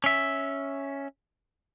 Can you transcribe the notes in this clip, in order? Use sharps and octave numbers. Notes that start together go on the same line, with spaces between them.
C#4 E5